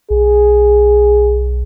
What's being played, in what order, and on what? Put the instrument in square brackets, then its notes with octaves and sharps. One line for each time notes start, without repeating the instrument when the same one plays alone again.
[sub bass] B1 [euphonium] G#4